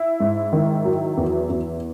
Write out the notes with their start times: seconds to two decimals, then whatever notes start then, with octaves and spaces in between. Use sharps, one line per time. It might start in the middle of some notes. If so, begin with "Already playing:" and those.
Already playing: E4
0.20 G#2
0.53 D#3
0.85 F#3
1.17 E2
1.50 E2